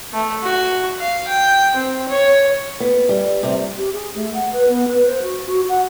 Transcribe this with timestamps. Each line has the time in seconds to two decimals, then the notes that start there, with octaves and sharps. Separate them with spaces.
0.13 A3
0.43 F#4
0.99 F5
1.28 G5
1.75 C4
2.09 C#5
2.80 B3
3.09 G3
3.43 C3
3.77 G4
3.93 G#4
4.15 A3
4.34 F#5
4.53 B4
4.68 B3
4.88 B4
5.06 C5
5.22 F#4
5.45 F#4
5.69 F#5